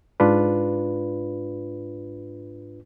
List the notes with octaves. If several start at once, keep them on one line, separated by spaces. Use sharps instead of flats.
G#2 D4 F4 B4